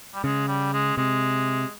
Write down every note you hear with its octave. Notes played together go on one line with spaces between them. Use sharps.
G3
C#3 G#3
G3
G#3
C3 G#3